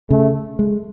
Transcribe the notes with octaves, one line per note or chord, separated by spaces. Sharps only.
C#3 A3
G#3